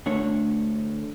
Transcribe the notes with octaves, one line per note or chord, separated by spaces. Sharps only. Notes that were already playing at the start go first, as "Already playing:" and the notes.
D2 D3 A3 D4 C#5